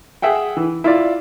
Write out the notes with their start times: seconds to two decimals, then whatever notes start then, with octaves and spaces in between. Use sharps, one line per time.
0.22 G#4 E5 F#5 G5
0.57 E3
0.84 E4 F4 D5